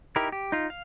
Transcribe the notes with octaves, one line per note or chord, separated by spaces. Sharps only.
D#4 E4 G4 A#4
G4
D#4 F4
F5